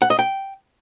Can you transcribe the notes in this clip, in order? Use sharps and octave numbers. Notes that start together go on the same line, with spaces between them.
F#5
D#5
G5